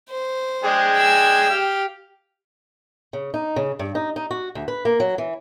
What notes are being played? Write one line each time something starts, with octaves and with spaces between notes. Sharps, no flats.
C5
G#3 D4 G#4 G5
G#5 E6
G4 F5
C#3
D#4
C#3
G2
D#4
D#4
F#4
D2
B4
A#3
F#3
E3